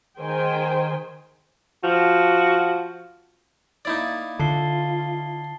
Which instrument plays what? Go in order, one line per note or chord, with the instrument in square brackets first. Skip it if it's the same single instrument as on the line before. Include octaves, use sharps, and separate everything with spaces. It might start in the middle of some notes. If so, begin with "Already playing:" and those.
[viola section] D#3 G#4 C5 G5 G#5
[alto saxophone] F3 [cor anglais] F#4
[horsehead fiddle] A#3 [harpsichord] D#4 E4 D5 [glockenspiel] A6
[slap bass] D3 [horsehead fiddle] F4 [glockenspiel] A5 C7 G7